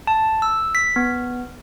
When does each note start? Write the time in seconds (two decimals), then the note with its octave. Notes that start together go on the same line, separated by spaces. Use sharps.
0.07 A5
0.42 E6
0.75 B6
0.96 B3